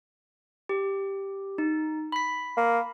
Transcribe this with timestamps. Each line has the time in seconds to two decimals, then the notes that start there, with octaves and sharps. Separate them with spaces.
0.69 G4
1.58 D#4
2.12 B5 B6
2.57 A#3